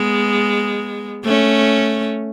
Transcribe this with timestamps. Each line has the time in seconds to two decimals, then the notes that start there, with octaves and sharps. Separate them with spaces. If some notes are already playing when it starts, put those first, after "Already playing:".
Already playing: G#3 B3
1.25 A3 C#4